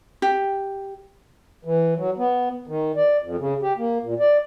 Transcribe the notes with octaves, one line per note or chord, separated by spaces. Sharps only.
G4
E3
F#3
B3
D#3
D5
F2
C#3
G4
A#3
A#2
D5